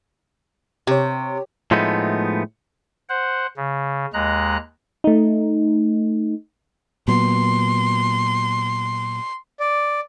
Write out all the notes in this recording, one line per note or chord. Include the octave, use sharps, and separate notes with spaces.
C3 G4 C#5
A2 F3 G#3 A3 B3 D#4
C5 F#5
C#3
D#2 G#3 A#5 F#6
A3 D#4
A#2 F#3 B3 C6
D5